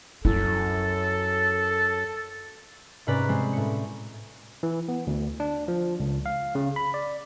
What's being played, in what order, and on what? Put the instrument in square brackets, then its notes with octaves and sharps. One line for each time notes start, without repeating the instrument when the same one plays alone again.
[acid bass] F#2 [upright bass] E4 [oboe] A4
[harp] G#2 C3 C#4 B4 D5 A#5
G3 G#3 C4 C5
A2 C#7
[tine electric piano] E3
B3
D2
D4
F3
C#2
F5
C#3
B5
D5